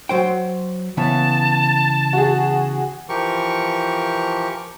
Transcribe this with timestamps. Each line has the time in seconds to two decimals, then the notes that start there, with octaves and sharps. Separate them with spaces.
0.09 F#3 C5 G5
0.97 C#3 E3 B3 A5
2.13 F#4 G#4
3.09 E3 F3 G4 A#4 C#6